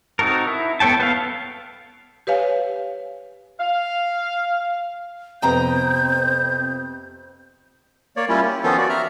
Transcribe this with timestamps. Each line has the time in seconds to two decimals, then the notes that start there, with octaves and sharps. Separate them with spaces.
0.19 C4 D#4 F#4 A4 A#4
0.48 E4
0.80 B3 A4 C#5 G5 A5
0.99 B3 A4 F5
2.27 G4 B4 C#5 F5 G#5
3.60 F5
5.42 F2 C3 B3 C4 G5 A#5 D#6 G6
8.17 A#3 C#5 D5
8.29 G3 A#3 C#4 E4 F4
8.45 G4
8.63 D#3 F3 B3 C#4 F4 A4
8.77 F#4 D5
8.89 E5 A#5 F6